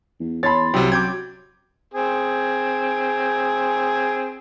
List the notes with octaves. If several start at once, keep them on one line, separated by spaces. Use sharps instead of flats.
E2
E2 C#5 A5 B5 C6 A6
C2 C3 F#3 C4 E4
C4 C#4 D6 G6 G#6
C4 G#4